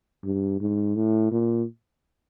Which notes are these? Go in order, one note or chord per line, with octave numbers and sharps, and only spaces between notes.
G2
G#2
A2
A#2